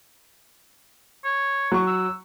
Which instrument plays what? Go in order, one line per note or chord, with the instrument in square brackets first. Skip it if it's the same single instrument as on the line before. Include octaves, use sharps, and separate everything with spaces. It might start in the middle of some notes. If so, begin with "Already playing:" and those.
[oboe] C#5
[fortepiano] F#3 C#6
[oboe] E6